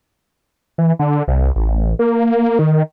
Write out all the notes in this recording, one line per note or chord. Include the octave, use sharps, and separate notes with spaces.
E3
D3
C2
A1
A#3
D#3